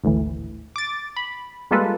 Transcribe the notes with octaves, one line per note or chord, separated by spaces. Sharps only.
G#1 D2 A2 E3
D6 A6
B5
G3 G#3 A#3 F4 A4 B4